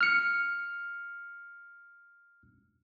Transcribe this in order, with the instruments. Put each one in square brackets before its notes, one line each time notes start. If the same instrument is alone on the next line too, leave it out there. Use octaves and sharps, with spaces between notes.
[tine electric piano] F6 C#7